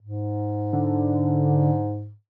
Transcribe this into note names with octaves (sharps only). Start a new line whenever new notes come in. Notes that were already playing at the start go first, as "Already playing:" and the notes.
G#2
D3